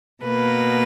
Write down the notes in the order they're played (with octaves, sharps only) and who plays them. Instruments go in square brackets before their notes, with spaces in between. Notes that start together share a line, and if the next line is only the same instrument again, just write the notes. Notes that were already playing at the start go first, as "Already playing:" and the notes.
[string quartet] B2 A#3 B4